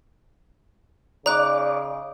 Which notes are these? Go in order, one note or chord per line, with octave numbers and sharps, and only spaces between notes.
C#3 D#4 D5 A#5 D6 F#6